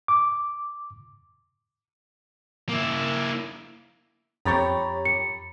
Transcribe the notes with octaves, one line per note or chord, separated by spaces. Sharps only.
D6
A#3 E4
F2 G4 C#5 A#5 B5 A6
C#7